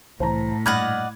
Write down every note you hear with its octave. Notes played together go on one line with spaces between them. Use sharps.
C2 A2 E3 C5 A5 A#5
G2 A#2 D5 D#5 F#5 B5 F6 G#6